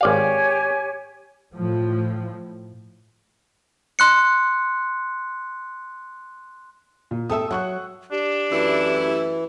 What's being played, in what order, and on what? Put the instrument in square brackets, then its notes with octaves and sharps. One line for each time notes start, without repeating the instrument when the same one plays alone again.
[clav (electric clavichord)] G#1 D5 F5 [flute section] G4 C#5 G#5
[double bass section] A2 F3
[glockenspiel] C6 F#6 C#7
[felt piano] A#2
[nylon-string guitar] G4 A4 E5 [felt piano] D#6 E6
[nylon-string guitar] F#3 [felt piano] F#5 C#6 F#6
[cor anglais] D4 [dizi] G4
[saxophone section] F#2 A3 E4 [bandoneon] E3